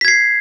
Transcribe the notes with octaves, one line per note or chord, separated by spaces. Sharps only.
G#6 B6 C7